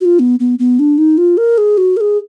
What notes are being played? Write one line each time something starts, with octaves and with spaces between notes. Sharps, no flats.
F#4
F4
B3
B3
B3
D4
D#4
F4
A#4
G#4
F#4
A#4
G#4